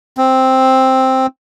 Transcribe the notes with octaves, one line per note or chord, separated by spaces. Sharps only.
C4